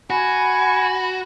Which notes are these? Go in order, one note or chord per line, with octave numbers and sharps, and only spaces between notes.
F#4 G#5 B5